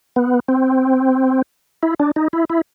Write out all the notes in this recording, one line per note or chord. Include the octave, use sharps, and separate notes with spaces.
B3
C4
E4
D4
D#4
E4
E4